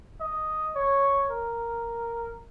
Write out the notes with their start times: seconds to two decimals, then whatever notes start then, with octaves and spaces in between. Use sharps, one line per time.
0.20 D#5
0.76 C#5
1.31 A#4